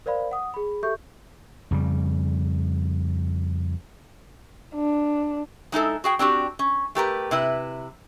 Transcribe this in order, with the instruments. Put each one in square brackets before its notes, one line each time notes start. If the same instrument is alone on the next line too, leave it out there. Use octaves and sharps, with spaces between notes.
[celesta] A#4 C5 D5 F5 B5
F#5 D#6
G#4 B5
G4 A4 E5 C#6 G6
[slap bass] F2 C#3 G3
[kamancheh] D4
[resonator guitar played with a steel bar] G#3 D#4 E4 A4
F#4 G#4 G5
C4 D4 F#4 G4
C#4
A3 G4 A#4 B4
C3 E4 B4